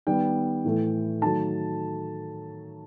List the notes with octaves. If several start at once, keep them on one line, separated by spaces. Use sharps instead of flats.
D#3 G3 B3 G5
A2 E3 A3
D#3 F#3 A3 A5